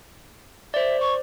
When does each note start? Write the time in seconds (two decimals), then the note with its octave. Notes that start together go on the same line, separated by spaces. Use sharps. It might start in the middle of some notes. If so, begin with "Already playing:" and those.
0.74 C5 D5 E5
1.00 C#6